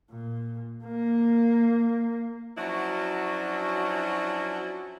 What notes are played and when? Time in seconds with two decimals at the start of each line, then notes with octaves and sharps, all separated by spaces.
0.11 A#2
0.84 A#3
2.58 F3 F#3 C#4 D4 E4 F#4